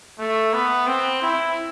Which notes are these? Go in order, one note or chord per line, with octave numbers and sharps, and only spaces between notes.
A3
B3
C4
E4